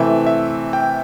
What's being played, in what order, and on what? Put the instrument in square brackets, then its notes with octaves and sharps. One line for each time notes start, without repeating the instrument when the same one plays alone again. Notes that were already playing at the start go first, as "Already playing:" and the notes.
Already playing: [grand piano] C3 E3 A3 [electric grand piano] E5
[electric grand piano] E5
G5